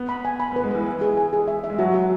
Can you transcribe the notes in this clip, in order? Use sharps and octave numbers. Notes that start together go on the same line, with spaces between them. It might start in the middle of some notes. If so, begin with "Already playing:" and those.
Already playing: B3
B5
G#5
B5
B3 B4
G#3
E3 B4
E3 G#5
G#4
G#5
G#4
E5
E5
G#3
F#3 F#4
F#4